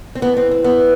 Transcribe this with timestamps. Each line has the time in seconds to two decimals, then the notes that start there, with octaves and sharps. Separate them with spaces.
0.15 C4
0.22 A2 E3 B3
0.37 C4
0.51 C4
0.64 B3